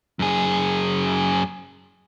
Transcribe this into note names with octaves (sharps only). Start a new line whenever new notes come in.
F#2 G#4